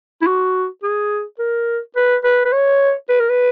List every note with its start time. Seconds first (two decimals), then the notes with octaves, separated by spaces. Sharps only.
0.22 E4
0.27 F#4
0.83 G#4
1.39 A#4
1.96 B4
2.24 B4
2.45 B4
2.53 C#5
3.09 B4
3.20 A#4
3.30 B4